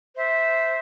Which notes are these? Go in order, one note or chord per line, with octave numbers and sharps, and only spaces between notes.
C5 E5